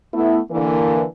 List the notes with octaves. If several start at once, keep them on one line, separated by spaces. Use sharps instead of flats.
A3 B3 E4
D3 E3 A#3